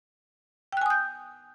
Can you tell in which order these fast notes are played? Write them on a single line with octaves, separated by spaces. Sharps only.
G5 F#6 G#5 D#6 G6